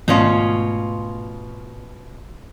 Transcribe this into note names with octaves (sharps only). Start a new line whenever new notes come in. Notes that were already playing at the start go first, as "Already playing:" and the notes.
G#2 B2 D#3 A3 C#4 F4